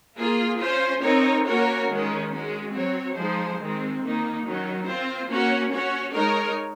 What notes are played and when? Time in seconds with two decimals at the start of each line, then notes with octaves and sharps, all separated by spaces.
0.17 A#3 F4 G#4
0.60 C#4 F4 C5
1.03 C4 D#4 A#4 C#5
1.46 A#3 C#4 F#4 A#4 C#5
1.88 D#3 G#3 C#4
2.31 G#3 C#4 F#4
2.73 F#3 C4 F#4 C#5
3.16 F3 G#3 D#4 G#4 C5
3.58 D#3 G#3 C4
4.01 D#3 A#3 D#4
4.44 D#3 F#3 C#4
4.86 C4 F4 C5
5.28 A#3 C#4 F#4 C#5
5.71 C#4 F#4 C#5
6.14 G#3 D#4 A#4 C#5